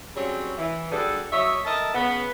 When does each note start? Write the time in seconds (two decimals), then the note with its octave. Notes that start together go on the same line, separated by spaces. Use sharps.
0.16 C#3 F#3 G3 C4 C#4 C#5
0.58 E3
0.92 G3 D4 F#4 G#4 A4
1.32 F#3 C#5 D#5 E5
1.65 A4 A#4 D#5 E5 A5
1.94 C#3 B3